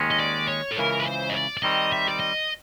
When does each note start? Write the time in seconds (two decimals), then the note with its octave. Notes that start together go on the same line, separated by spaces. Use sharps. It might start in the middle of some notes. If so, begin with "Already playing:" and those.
Already playing: D#2 D#3 G#3 C#4
0.11 D#5
0.20 D5
0.49 C#5
0.72 A4
0.78 C#2 C#3 E3 A#4
1.00 B4
1.06 C5
1.30 D#5
1.35 D5
1.57 D5
1.63 D#3 G3 C4 D#5
1.92 E5
2.08 D5
2.20 D#5